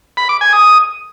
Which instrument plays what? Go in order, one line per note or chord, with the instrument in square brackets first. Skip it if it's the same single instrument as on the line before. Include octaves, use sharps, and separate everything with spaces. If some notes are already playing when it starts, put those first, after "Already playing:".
[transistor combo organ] B5
D6
G#5
D#6